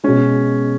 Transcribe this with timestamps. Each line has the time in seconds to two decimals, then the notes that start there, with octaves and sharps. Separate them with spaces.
0.04 B2 G#3 C#4